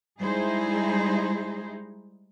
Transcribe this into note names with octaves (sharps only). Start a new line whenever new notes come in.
G3 G#3 D#4 E4 G#4 C5